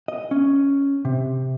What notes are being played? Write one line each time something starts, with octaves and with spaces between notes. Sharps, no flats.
D#5
C#4
C3